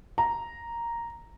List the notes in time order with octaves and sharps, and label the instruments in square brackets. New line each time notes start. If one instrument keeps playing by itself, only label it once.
[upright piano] A#5